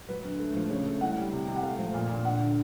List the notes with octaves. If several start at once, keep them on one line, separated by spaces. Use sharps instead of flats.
F#3 B4
D2
A3
F3
C#3 C#5
A3
C2 F#5
G3
C3
C3
F#5
A3 F5
F3
A#2
A#2
D2 F#5
D3